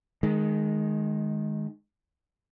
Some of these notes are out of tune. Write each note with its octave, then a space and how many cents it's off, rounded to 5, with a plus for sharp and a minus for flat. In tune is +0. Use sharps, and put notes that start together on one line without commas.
D#3 -5 G#3 +15